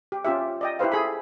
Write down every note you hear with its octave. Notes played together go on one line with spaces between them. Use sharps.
G4
C#4 F4 G4 E5
D5 D#5 G5
E4 G4 B4 C5 F5
G#4 A4 B5